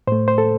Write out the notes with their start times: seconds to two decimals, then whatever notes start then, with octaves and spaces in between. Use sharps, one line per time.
0.07 A2 A3 C5
0.28 C5
0.38 A4